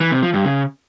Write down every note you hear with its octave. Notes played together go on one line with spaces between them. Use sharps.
E3
C3
F3
G2
C#3